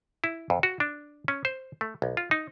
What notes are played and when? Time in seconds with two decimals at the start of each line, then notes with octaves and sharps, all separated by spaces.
0.24 E4
0.50 F2
0.63 F#4
0.80 D4
1.28 C#4
1.45 C5
1.81 A3
2.02 B1
2.17 F4
2.31 D#4